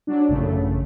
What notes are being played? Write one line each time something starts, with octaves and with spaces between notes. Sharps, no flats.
F#3 D4
A1 F#2 C#3 A3